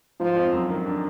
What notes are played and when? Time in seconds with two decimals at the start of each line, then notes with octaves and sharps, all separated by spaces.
0.20 G#2 F3
0.36 F2
0.53 F#2
0.69 D#3
0.86 D4